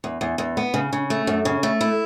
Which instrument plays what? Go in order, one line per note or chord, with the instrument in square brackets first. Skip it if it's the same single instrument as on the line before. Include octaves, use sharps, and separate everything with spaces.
[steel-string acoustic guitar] E2
E2
E2
B3
C#3
C#3
A3
F#2
C#3
A3
E4